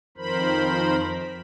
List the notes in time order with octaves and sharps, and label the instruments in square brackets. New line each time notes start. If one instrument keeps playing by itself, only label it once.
[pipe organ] F2 D#3 F3 A#4 C5 B5